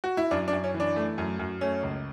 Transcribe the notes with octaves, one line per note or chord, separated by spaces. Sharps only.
F#4
E4
F#2 D4
D4
F#2
C#4
E3
D4
A3
F#2
F#2
A3 C#4
C#2